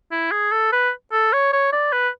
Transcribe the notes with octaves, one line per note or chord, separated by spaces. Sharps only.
E4
G#4
A4
B4
A4
C#5
C#5
D5
B4